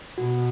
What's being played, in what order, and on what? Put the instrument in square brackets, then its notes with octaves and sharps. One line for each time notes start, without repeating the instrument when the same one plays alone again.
[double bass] B2 [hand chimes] F#4